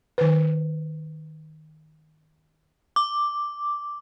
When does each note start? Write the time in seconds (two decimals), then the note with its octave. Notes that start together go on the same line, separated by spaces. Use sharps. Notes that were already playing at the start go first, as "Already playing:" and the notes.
0.18 D#3 B4
2.96 D6